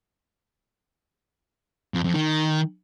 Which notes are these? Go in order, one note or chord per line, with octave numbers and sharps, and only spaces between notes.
F2
F2
D#3